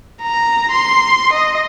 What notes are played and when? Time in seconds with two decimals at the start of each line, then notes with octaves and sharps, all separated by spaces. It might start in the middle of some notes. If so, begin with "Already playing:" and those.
0.21 A#5
0.72 C6
1.33 D#5